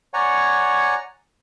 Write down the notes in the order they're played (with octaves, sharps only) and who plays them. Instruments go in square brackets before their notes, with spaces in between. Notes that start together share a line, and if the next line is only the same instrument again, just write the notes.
[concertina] C#5 D5 F#5 G#5 A#5 C#6